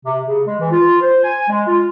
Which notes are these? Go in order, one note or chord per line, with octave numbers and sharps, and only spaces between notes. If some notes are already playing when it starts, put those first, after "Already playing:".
C3
C#3
G#3
E3
F4
C5
G#5
G#3
F4